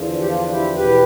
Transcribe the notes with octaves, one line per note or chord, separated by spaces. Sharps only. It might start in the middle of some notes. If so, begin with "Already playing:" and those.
Already playing: E2 D3 F3
G4
D4 F4
E4 G4
E2 B2 G4 B4